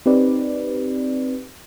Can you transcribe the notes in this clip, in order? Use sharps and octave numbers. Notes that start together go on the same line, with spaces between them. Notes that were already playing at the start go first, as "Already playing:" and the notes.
C4 D#4 G4 B4 D5